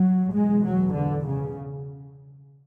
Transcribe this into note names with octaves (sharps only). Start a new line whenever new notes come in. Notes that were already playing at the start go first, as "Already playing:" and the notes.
Already playing: F#3
E2 B2 G#3
F#3
D3
C#3